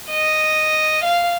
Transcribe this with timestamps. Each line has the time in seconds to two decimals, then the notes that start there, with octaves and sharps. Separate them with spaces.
0.11 D#5
1.04 F5